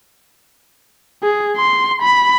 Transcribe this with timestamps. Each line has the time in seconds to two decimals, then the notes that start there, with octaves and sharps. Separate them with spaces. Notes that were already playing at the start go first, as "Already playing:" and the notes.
1.23 G#4
1.57 C6
2.02 B5